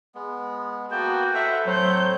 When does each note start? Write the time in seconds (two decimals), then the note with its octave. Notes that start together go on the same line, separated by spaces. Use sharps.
0.15 G#3 B3
0.92 A#3 B3 F#4 G5 A5
1.34 A4 B4 C5 E5 F#5 A#5 C#6
1.66 A2 F#3 C4 C5 C#5 G6